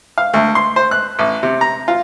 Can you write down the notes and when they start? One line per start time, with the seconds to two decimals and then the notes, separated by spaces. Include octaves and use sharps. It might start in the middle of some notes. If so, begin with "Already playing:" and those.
0.18 F5
0.34 D2
0.55 C6
0.76 C5
0.91 F#6
1.19 A1
1.43 C3
1.61 A#5
1.88 F4